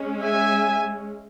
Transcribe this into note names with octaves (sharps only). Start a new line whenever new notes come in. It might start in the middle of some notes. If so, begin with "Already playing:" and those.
Already playing: G#3 C#4
E5 G#5